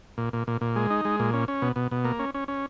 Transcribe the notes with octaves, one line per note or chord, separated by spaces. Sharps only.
A#2
A#2
A#2
A#2
G#3
D#4
G#3
A#2
C#4
C#4
B2
B2
B2
A#3
C#4
C#4
C#4